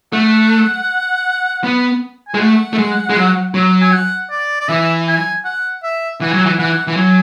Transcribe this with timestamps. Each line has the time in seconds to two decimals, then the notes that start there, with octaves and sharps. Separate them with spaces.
0.13 A3 F#5
1.64 B3
2.28 G#5
2.34 G#3
2.40 A3 F#5
2.73 A3
2.78 G#3
3.10 G#3
3.16 F#3
3.54 F#3
3.81 G#5
3.93 F#5
4.30 D5
4.61 D5
4.69 E3 E5
5.07 G#5
5.45 F#5
5.83 E5
6.21 E3 F#5
6.31 F#3 G#5
6.42 E3 F#5
6.58 E3 F#5
6.87 E3
6.97 F#3 G#5